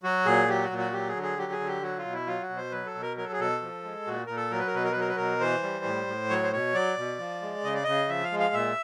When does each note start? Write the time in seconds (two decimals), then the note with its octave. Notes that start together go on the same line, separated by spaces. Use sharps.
0.03 F#3 F#4
0.25 A#2 G#4
0.48 F#3 G4
0.64 F#4
0.70 A#2
0.78 F#4
0.92 F#3 G4
1.08 G#4
1.16 D3
1.23 G#4
1.38 F#3 G4
1.52 G#4
1.59 D3
1.67 G4
1.82 F#3 F#4
1.98 F4
2.05 B2
2.13 E4
2.27 F#3 F4
2.42 F#4
2.49 B2
2.57 C5
2.71 F#3 B4
2.86 A4
2.94 B2
3.02 A#4
3.17 F#3 A#4
3.24 A4
3.32 G#4
3.39 B2 A4
3.62 F3
3.84 G#3
4.07 A#2 F#4
4.26 A#2 A#4
4.36 A4
4.51 F#3 A#4
4.59 B4
4.67 A#4
4.74 B2 B4
4.84 A#4
4.92 B4
4.96 F#3 A#4
5.08 B4
5.17 B2 A#4
5.40 E3 C5
5.63 G3
5.85 A2
6.07 A2
6.30 F#3 C#5
6.43 C5
6.53 B2 C#5
6.74 F#3 D5
6.98 B2
7.19 F3
7.42 G#3
7.64 C#3 D#5
7.74 D5
7.83 C#3 D#5
8.08 F3 E5
8.24 F5
8.32 G#3
8.39 F5
8.53 A#2 E5